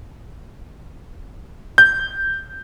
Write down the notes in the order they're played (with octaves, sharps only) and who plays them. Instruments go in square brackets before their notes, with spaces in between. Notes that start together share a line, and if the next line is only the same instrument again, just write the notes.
[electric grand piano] G6